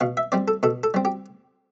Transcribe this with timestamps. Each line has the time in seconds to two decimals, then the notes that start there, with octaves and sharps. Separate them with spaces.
0.01 B2 F5
0.17 E5
0.32 G3 C4 D5
0.48 A4
0.63 B2 A4
0.83 A4
0.94 G3 C4
1.05 G4